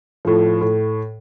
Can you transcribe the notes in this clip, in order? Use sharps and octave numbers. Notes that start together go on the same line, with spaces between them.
A2 F3
A2